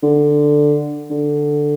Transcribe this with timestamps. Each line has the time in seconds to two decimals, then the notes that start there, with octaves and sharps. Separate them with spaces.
0.03 D3
1.10 D3